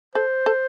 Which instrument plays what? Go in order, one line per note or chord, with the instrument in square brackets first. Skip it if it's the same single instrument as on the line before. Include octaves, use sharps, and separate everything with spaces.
[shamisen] A4 [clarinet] C5
[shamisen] A4